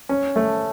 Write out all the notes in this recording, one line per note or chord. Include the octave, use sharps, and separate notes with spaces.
C#4
A3